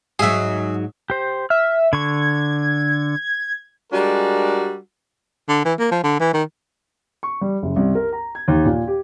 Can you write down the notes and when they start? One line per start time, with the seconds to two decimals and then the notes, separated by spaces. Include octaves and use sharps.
0.19 G#2 F#3 G#4 E5
1.10 G4 C5
1.50 E5 F6
1.93 D3 C#6 G#6
3.93 G3 G#3 D4 F#4 A#4
5.49 D3
5.65 E3
5.79 A#3
5.91 F3
6.04 D3
6.20 E3
6.33 D#3
7.23 C#6
7.41 G3
7.63 F#1
7.76 C2
7.95 A#4
8.13 A#5
8.35 G#6
8.48 D#2
8.65 A#2
8.88 G4